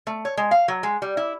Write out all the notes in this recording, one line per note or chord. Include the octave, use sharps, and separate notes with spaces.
A3
C#5
G#3
F5
F#3
G#3
G3
E4